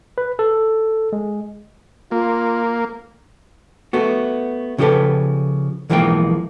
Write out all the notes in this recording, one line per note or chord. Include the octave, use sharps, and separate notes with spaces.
B4
A4
G#3
A#3 F4
A3 B3 F#4
C#3 F3 E4 G4 A4 B4
B1 E3 F3 G#3 A#3 G5